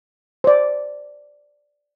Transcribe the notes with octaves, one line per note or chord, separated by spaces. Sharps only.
C5 D5